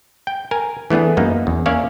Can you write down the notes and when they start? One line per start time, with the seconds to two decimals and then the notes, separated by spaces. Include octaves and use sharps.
0.27 G5
0.51 A#4 G#5
0.90 E3 A3 B3 D4 G#4
1.17 F#2 A#3 B3 D#4
1.47 E2
1.66 A#3 C#4 C#5 D5 E5 F5